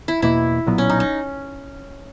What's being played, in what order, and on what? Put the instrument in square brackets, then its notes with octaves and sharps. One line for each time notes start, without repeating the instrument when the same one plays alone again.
[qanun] E4
[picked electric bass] E2 B2 A#3 [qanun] E4
[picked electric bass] B1 A#2 F#3 B3
[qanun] C#4
D#4
D#4